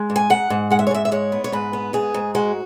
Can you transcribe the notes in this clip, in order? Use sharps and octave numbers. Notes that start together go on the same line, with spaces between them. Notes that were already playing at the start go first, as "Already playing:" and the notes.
Already playing: G#3
G#2
G#5
G#2 F#5
G#2
G#3 F#5
E5
C#5
G#2 E5
E5
G#3 C#5
B3
C#5
G#2 B4
B3
G#2 G#4
G#2
G#3 F#4